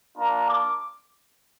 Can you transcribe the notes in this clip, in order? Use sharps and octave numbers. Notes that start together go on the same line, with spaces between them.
A#3 D4 F4 A#5
D6